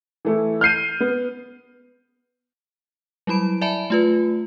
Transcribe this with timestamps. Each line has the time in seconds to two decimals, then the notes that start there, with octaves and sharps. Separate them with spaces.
0.25 E3 A3 E4
0.61 F6 G6 C7 D#7
1.00 B3
3.27 F#3 G3 E4 B5 D7
3.61 D5 E5 G#5 A5 B5
3.90 A3 F4 B4